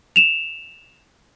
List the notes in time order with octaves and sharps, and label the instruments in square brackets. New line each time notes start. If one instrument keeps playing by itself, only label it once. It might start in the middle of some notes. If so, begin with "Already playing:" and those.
[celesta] E7 F7